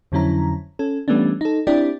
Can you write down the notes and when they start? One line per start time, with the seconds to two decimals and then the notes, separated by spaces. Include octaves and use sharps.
0.12 F2 D3 F#3 C#4 E4 A#5
0.79 C#4 A4
1.08 E3 G3 A3 B3 C#4 D4
1.41 D#4 A4
1.67 C4 D4 E4 G4 D5